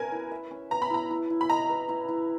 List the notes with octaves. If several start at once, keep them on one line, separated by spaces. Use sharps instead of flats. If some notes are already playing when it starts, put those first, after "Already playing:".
Already playing: C#4 A#4 B4 G#5
E4
E5
C#4
B4 A#5
B5
E4 A#5
E4
E4
B5
D#5 A#5
B4
E4
E4